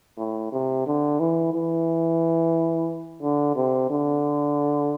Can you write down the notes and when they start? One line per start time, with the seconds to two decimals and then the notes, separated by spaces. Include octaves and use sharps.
0.18 A2
0.52 C3
0.86 D3
1.20 E3
1.53 E3
3.22 D3
3.56 C3
3.90 D3